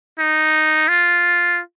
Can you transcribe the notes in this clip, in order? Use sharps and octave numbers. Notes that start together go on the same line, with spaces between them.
D#4
F4